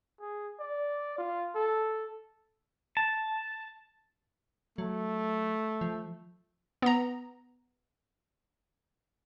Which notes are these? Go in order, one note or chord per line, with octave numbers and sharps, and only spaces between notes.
G#4
D5
F4
A4
A5
F#3 A3
F3
B3 A#5